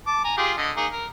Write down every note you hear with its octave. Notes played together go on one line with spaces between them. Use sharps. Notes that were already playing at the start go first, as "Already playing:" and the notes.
A5 D6
G#5 A#5
F4 G4 G#4
D3 D#5
A#3 D#4 G#4
A#4